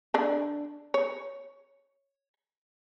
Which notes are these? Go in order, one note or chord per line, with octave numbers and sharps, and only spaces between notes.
D3 D4
C#5